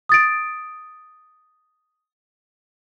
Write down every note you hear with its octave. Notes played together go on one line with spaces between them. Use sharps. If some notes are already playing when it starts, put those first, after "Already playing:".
D#6 A6 D7